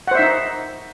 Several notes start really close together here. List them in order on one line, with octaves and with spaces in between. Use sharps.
F#5 C5 E5 D#4